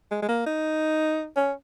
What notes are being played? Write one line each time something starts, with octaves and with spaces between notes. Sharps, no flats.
G#3
G#3
A#3
D#4
C#4